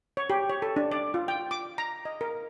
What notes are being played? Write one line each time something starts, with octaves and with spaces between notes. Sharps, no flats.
C#5
G4
C#5
A4
D4
D5
F4
G5
D6
A#5
D#5
A#4